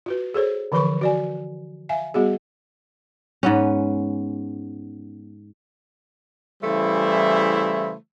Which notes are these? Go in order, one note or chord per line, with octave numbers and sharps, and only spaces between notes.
F4 F#4 B4
G#4 A4 C5 C#5
D3 E3 F3 B4 B5 C#6
F#4 D5 G#5
E5 F5 G#5
G3 B3 F#4 G#4
G#2 B3 C#4
C#3 E3 G3 A3 E4 C5